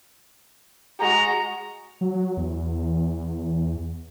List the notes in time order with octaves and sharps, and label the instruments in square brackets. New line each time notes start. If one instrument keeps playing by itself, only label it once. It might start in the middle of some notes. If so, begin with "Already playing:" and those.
[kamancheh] G#3 F#4 [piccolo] A#5
[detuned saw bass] F#3
E2